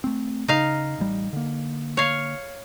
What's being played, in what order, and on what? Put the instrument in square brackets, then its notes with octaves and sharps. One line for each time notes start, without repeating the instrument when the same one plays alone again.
[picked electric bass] A3 C4
[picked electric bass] C#3 [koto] D#4 F5
[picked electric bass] A1 G3
D3 A#3
[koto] C#5 F5